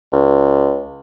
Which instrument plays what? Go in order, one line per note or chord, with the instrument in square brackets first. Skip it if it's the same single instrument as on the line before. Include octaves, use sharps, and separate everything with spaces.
[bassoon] C#2